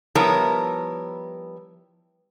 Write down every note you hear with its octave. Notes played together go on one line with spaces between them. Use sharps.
F3 G3 B3 E4 A#4 C#5